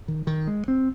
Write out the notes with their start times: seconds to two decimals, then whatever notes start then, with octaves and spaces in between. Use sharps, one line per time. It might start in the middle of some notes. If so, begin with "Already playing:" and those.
0.08 D#3
0.27 D#3
0.47 G#3
0.68 C4